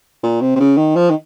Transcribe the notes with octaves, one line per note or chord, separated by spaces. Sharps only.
A#2
C3
C3
C#3
D#3
F3
D#3